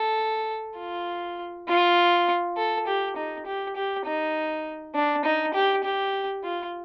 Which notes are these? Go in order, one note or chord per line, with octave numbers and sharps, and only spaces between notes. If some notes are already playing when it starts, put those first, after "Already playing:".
Already playing: A4
F4
F4
A4
G4
D#4
G4
G4
D#4
D4
D#4
G4
G4
F4